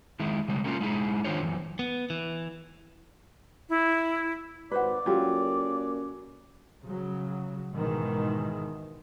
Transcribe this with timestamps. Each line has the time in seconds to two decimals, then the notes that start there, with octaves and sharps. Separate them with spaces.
0.20 D#3 G#3 E4
0.48 C#3 G3 G#3
0.64 A3 A#3 C#4 E4 F4
0.81 G#3 D#4 E4 G#4
1.24 D#3 D4 F4 C5 C#5
1.42 F#2 E3
1.79 B3
2.10 E3
3.69 E4
4.72 G#1 B4 C5 D5 F#5
5.06 F#3 A#3 C#4 F4 G4 A4
6.83 C#3 F#3
7.73 G#2 B2 D#3 E3 G#3